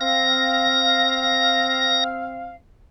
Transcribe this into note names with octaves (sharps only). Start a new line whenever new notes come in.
C4 F5 A#6